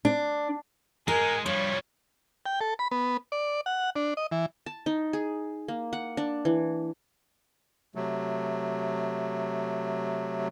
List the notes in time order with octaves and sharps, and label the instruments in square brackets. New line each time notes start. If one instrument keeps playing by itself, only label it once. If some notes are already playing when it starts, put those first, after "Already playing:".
[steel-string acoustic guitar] D4
[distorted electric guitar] G#3 D#4 [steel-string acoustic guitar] A#4 [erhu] G#5
[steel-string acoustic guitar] G2 [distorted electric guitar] F3 G3 [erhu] C#5
[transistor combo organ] G5
A4
B5
B3
D5
F#5
D4
D#5
E3
[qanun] A5
D#4
G#4
A#3
F#5
D4
E3
[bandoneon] C3 F#3 A3